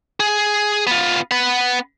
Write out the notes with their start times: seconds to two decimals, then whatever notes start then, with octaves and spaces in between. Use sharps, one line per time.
0.20 G#4
0.87 B3 F4
1.31 B3 F#5